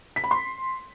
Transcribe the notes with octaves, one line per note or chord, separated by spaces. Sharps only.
B6
B5
C6